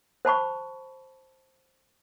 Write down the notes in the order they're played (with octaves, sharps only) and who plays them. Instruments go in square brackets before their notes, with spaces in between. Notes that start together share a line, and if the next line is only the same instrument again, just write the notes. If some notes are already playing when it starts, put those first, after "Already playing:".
[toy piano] C5 A5 B5 C#6